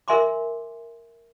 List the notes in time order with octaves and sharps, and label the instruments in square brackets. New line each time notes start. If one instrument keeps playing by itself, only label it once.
[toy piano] A#4 E5 G#5 C6 D6